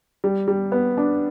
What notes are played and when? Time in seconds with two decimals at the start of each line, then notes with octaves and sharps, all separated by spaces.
0.24 G3
0.48 G3
0.72 B3
0.97 D4